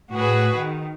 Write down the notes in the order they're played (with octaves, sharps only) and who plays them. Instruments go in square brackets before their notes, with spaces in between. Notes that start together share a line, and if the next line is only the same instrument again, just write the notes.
[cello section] A2 F#4 G#4 B4
D#3